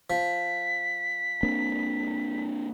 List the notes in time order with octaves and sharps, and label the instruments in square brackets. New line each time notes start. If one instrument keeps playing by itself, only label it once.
[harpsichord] F3 [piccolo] B6
[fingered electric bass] A#3 C4 D4